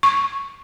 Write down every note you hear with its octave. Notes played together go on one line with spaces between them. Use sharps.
C#6